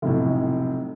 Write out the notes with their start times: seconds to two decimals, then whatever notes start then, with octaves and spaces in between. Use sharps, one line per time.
0.02 F1 B1 A2